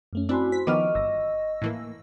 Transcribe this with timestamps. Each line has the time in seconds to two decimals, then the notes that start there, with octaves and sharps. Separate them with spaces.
0.13 F#2 A3 C#4
0.29 C4 D4 E4 F#4 G#5 B5 C6
0.52 C5 B6
0.67 D#3 F3 B3 D#5 C#6 D6 F6
0.95 G1 E6 A#6
1.62 A2 E3 A#3